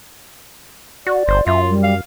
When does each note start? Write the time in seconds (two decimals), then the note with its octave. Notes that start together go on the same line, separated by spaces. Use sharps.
1.07 F#4 D5
1.28 G1 C5
1.47 F#2 F4 E5
1.70 G3
1.84 F5